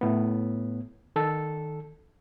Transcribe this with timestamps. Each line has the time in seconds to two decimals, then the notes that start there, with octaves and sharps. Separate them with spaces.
0.01 A2 B3
1.16 D#3 A4